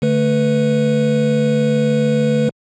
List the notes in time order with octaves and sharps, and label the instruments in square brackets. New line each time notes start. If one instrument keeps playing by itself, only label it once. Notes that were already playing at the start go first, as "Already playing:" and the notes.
[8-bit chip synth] D3 A3 B4